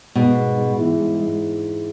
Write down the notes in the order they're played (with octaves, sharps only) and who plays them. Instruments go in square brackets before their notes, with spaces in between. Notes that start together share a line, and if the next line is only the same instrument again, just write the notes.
[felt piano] G#2 [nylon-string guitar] B2
[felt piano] G#2
G#2
E3
G#2
G#2